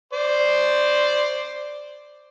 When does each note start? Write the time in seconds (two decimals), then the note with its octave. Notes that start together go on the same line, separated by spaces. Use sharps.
0.13 C5 D5